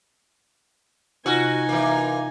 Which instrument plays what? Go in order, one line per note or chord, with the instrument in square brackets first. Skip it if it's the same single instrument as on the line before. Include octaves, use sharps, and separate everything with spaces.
[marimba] C3 F4 A#6 [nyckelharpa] D#4 G#5 [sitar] F#4
[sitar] E3 A#3